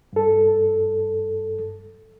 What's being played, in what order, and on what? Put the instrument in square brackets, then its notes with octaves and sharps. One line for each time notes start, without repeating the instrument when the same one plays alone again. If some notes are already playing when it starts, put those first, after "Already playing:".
[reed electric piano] G2 A4